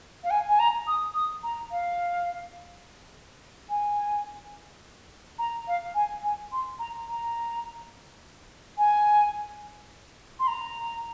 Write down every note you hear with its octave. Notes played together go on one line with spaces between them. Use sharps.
F5
G#5
G#5
A#5
D#6
D#6
A#5
F5
G#5
A#5
F5
G#5
G#5
C6
A#5
A#5
G#5
C6
A#5